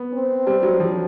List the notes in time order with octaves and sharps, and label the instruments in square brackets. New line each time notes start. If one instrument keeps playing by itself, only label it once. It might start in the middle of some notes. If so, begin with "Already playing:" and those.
Already playing: [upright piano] B3
[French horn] C4
[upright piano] G3
F#3
F3